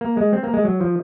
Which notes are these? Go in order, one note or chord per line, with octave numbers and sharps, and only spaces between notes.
A#3
G#3
C4
A#3
G#3
F#3
F3